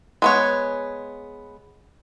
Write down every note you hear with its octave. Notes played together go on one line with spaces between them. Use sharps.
G#3 B3 C#5